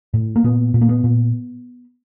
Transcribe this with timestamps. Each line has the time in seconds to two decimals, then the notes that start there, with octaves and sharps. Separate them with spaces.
0.14 A2
0.36 A#3
0.44 A#2 B3
0.74 A#2
0.81 A#3
0.89 B3
1.04 A#2